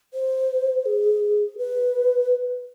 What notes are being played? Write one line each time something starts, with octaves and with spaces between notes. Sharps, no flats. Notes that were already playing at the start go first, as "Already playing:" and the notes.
C5
G#4
B4